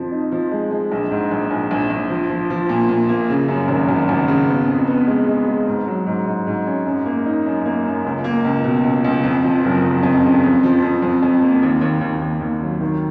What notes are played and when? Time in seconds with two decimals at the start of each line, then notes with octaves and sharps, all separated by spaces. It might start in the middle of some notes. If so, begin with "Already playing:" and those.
Already playing: F2 F3
0.12 D#4
0.32 F3
0.52 G#3
0.71 G#3
0.92 A#1
1.11 G#2
1.31 A#1
1.51 A#1
1.71 A#1
1.90 A#1
2.10 F3
2.30 F3
2.50 F3
2.69 A#2
2.89 A#2
3.09 A#3
3.29 C#3
3.48 F#2
3.68 G#1
3.88 G#1
4.09 G#1
4.28 C#3
4.48 B3
4.68 F2
4.88 B3
5.07 G#3
5.27 G#3
5.47 G#3
5.67 G#2
5.87 F#3
6.07 G#2
6.26 G#2
6.47 G#2
6.67 C#4
6.86 F#2
7.06 A#3
7.26 D#4
7.46 F#2
7.66 A#3
7.85 F#2
8.05 C#2
8.24 A#3
8.44 C#2
8.64 B2
8.84 C#2
9.04 C#2
9.24 F2
9.43 F3
9.64 F#1
9.84 F#1
10.03 F2
10.23 C#3
10.43 F2
10.63 F3
10.82 F2
11.02 F2
11.22 F2
11.42 A#3
11.63 D#2
11.81 D#2
12.01 D#2
12.22 D#2
12.41 D#2
12.61 F#3
12.81 D#3